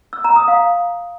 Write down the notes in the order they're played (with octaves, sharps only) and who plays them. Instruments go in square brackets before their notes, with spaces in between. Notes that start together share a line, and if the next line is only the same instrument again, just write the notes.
[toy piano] E6
A#5
D#6
F5